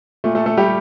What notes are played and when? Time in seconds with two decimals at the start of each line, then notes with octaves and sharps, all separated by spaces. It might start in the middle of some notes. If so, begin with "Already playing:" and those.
0.24 A#2 A3
0.35 A3 A4
0.46 A3 A4
0.57 G3 G4